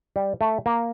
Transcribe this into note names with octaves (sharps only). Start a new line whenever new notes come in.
G3
A3
A#3